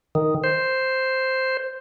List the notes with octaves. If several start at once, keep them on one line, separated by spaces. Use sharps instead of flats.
D#3
C5